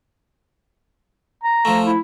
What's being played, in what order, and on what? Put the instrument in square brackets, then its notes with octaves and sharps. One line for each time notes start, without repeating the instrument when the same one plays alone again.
[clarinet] A#5
[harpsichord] F3 A3
[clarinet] E4